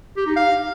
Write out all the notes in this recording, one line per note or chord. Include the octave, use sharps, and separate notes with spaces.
G4
D#4
F5